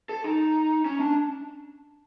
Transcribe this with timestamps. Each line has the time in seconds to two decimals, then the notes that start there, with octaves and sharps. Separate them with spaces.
0.09 A4
0.24 D#4
0.85 C#4
1.00 D4